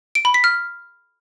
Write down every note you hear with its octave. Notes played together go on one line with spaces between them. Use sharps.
D7
B5
B6
F6